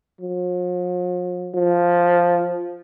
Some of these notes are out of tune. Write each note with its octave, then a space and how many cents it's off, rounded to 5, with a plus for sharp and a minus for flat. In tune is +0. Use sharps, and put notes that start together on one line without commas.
F3 +45
F3 +0